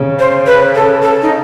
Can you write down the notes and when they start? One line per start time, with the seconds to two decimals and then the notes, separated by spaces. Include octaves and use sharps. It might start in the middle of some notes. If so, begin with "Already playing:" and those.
Already playing: C#3
0.19 C5
0.46 B4
0.75 A4
1.02 A4
1.22 D#4